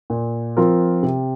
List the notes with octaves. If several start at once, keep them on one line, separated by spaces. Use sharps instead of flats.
A#2
F3 C4 F4 A#4
C3